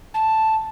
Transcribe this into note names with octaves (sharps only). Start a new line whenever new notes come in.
A5